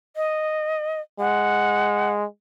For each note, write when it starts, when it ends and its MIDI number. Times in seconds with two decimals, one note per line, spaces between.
0.16 1.01 75
1.20 2.25 56
1.20 2.12 78